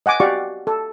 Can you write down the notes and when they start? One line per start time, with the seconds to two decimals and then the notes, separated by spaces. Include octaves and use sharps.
0.06 D#5 F#5 G#5 D6
0.20 F#4 G4 D5 F5 C#6
0.67 A4